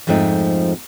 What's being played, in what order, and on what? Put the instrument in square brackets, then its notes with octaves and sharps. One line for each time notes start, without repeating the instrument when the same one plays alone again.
[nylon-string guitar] F2 G#2 F3 A3 C4 D#4